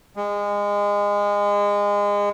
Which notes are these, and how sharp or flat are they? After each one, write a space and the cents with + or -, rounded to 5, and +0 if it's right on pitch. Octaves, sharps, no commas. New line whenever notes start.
G#3 -25